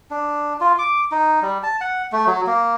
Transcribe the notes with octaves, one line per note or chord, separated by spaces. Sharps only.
D4
F4
D6
D#4
G3
A5
F#5
A3
F#3
A#3